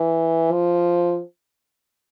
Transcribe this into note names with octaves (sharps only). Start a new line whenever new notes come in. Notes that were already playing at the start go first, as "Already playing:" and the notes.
Already playing: E3
F3